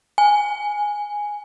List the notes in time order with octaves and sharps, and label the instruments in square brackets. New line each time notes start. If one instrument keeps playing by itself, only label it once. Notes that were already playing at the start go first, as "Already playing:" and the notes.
[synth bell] G#5